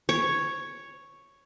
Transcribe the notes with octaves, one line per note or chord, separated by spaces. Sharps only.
C#5